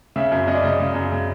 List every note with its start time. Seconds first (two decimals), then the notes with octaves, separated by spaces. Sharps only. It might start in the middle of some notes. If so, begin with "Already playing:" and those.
0.16 C#3 E5
0.32 F#2
0.47 F#2 D#5
0.55 D5
0.64 C#3 D#5
0.80 C#3
0.95 F#2
1.12 C#3